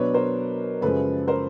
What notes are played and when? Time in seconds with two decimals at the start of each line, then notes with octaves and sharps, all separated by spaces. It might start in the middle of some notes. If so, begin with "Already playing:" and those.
Already playing: B2 F#3 B3 D4 B4 C#5
0.14 A#4 C5
0.82 F#2 C#3 F3 G#3 A4 B4
1.28 A#4 C5